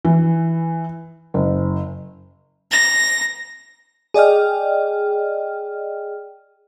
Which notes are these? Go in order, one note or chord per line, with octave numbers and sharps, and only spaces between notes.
E3
F#1
A#6
G#4 D5 D#5 G5 F6